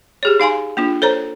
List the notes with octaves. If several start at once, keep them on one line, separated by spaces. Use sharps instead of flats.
G4 G#4 C#5
D#4 F5 G#5 C6
A#3 D4 F4
A4 C5 C#5 A#5